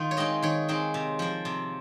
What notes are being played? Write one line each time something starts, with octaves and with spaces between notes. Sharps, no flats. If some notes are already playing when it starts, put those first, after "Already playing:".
Already playing: D#3 F4
C#5
G#3 C4 D#4 D#5
D#3 C#5
G#3 C4 D#4
C3
F3 A#3
C3